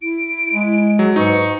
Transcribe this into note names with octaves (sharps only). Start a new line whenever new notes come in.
E4 D7
G#3
F#3 G#4
G#2 D#4 B4 C#6